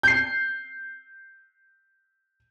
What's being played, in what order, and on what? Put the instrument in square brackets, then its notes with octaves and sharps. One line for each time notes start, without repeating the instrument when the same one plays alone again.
[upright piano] G6 C7